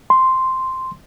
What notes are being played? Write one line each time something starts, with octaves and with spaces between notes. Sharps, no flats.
C6